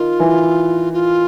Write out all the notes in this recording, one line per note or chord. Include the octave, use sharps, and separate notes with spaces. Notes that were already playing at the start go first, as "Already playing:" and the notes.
Already playing: D#3 D#4 F4
E3 E4
F4